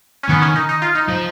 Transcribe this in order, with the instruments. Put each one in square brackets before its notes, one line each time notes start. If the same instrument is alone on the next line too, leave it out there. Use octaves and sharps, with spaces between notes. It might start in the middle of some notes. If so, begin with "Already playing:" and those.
[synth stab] C#4
[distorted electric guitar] D#3 [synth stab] B3
[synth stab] C#4
D#4
D#4
F4
D#4
[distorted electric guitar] F3